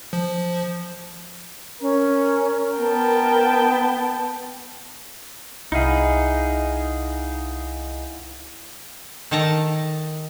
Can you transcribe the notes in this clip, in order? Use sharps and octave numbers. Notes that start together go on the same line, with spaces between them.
F3
C#4 A#4
B3 G5 A5
C2 D#4 E4 G#4 F5 F#5
D#3 A4 A5 A#5